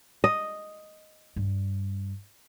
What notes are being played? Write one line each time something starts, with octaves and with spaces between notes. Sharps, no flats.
D#5
G2 G3